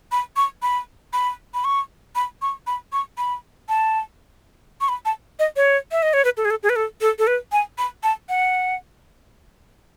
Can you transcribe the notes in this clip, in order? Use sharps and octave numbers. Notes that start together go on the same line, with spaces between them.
B5
C#6
B5
B5
B5
C#6
B5
C#6
B5
C#6
B5
A5
C#6
B5
A5
D#5
C#5
E5
D#5
C#5
B4
A4
G#4
A4
G#4
B4
A4
A4
A4
B4
G#5
B5
A5
F#5